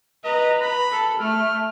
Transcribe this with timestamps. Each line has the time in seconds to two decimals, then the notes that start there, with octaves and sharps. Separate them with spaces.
0.24 B4 D#5 A#5
0.62 B5
0.92 A4
1.20 A3 F6